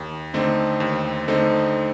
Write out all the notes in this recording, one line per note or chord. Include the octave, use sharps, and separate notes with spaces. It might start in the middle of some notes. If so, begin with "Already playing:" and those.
Already playing: D#2
D3 A3 C4 D#4
D#2
D3 A3 C4 D#4